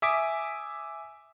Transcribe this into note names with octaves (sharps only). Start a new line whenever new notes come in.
E5 G#5 D6 D#6 B6 D7